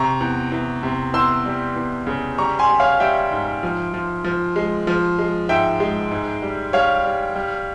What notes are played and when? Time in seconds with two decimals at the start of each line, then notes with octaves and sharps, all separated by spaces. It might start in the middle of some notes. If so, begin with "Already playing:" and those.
Already playing: C3 A#5 C#6
0.21 E2
0.52 E2
0.83 C3
1.14 E2 C6 E6
1.45 G3
1.76 E2
2.07 C#3
2.38 G3 A#5 C#6
2.59 G#5 C6
2.69 G3
2.80 C#5 F5
3.00 G3 E5 G5
3.32 G#2
3.63 F3
3.94 F3
4.24 F3
4.56 G#3
4.87 F3
5.19 G#3
5.49 G#2 E5 G5
5.80 G#3
6.11 G#2
6.42 G3
6.73 G3 C#5 F5
7.05 G3
7.36 G3